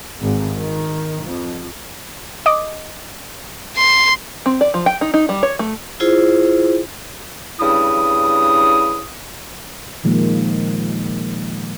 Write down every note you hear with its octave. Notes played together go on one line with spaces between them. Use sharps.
G#1
D#3
F2
D#5 D6 D#6
C6
C4
D5
F3
G5
D#4
D#4
G3
C#5
A3
E4 F4 G#4 C5
G2 C#3 E4 D#6
A#2 D#3 F3 G#3 A#3